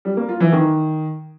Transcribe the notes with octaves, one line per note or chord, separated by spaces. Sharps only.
G3
A#3
F4
E3
D#3